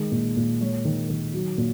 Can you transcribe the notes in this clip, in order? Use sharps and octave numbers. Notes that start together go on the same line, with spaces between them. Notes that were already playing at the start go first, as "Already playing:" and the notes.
Already playing: D#3 G#3
A#2
A#2
G#3 C#5
D#3
D#3
F#3
A#2